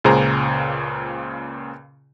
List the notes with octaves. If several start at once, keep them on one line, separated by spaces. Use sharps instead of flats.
C#2 A#2 C#3 G#4 C5 A#5